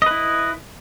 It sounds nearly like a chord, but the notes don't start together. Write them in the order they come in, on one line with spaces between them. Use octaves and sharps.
D#5 B4 E4